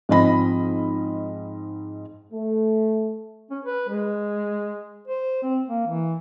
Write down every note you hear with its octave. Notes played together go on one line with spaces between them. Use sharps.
G#2 F3 C4 D#5 B5 A#6
A3
C#4
B4
G#3
C5
C4
A#3
E3